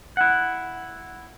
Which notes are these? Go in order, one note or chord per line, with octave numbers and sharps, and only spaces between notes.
E4 F#5